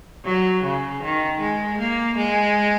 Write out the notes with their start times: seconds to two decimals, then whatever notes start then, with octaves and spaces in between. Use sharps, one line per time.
0.25 F#3
0.63 C#3
1.02 D#3
1.40 G#3
1.78 A#3
2.17 G#3